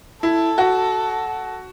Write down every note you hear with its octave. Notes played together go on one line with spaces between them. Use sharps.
E4 A4
F#4